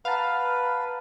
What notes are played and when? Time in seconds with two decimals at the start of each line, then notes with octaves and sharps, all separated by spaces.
0.05 B4 F5 F#5 A5 A#5